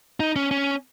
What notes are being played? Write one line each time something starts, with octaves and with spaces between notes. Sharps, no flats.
D#4
C#4
C#4